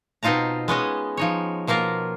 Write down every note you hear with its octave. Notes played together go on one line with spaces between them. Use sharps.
B2 C4 D#4 F4 A5 A#5
G#3 B3 C#4 D#5
F3 D#4 C#5
B2 F3 A#3 F4 A#4